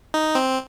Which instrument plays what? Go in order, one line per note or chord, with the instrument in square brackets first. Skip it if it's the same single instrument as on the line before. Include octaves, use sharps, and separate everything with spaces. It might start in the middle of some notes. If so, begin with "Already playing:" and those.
[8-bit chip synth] D#4
C4